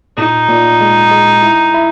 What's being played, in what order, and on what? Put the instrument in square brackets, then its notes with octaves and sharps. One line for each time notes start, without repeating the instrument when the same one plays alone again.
[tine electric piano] A#2 [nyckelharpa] D#4
[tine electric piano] A#2
G#3
G#3
E4
E4